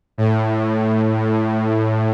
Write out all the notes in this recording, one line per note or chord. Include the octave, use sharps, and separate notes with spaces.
A2